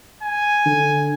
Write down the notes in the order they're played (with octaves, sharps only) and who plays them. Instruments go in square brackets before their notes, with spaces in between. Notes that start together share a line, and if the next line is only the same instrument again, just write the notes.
[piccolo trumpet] G#5
[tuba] D3